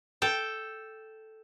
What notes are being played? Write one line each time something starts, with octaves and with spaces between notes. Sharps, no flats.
A4 G5